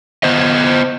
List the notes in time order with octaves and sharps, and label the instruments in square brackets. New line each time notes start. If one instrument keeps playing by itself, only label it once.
[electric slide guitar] B3 C5 D#5